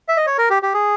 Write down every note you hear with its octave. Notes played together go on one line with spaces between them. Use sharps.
E5
D#5
C#5
A#4
G4
G4
G#4